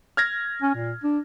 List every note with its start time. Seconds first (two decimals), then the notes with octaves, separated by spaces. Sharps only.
0.17 F6 G#6 A#6
0.62 C#4
0.74 A#2
1.04 D4